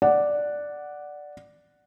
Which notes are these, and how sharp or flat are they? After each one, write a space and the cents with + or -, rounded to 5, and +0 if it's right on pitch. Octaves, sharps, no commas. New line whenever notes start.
D5 +0 F#5 +0